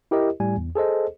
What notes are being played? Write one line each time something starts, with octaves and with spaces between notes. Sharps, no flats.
E4 G4 A#4 D#5
A2 G3 G#5
E2
G#4 A4 C5 D#5